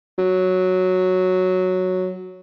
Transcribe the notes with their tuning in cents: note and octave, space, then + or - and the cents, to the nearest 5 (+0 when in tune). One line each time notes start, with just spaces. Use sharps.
F#3 -5